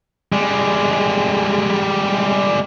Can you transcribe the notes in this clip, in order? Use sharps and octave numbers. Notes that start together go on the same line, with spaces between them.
G3 G#3